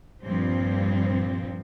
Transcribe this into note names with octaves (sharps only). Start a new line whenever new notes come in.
G2 A#2 F3 C4